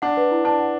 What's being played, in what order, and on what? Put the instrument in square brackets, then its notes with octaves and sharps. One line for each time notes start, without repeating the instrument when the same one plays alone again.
[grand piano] D4 [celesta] F#5
[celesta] B4
E4
[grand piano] D4 [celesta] A5
[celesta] F#5